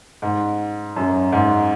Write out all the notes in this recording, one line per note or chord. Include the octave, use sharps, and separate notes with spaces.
G#2
F#2
G#2